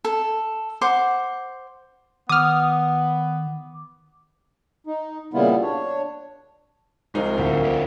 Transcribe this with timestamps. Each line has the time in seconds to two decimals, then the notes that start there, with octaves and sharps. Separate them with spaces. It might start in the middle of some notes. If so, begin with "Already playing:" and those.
0.04 A4
0.81 C5 F#5 D6
2.29 D#3 B3 D6 D#6 F6
4.87 D#4
5.34 A#2 C#3 G3 B3 E4 F4
5.62 D4 C#5
7.15 C2 F3 G#3 D#4
7.38 D2 A2 D3
7.64 B4 C#5 D5